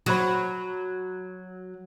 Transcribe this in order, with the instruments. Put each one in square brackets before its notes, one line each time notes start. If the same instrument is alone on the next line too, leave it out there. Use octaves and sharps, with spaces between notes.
[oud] F#3 [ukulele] F#4 C5 B5